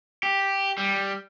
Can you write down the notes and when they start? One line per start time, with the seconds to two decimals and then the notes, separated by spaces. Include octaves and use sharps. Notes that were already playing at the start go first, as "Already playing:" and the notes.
0.23 G4
0.78 G3